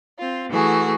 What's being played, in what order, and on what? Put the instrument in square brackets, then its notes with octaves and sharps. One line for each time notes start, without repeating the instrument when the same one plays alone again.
[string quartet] C4 F4
E3 A3 F#4 G#4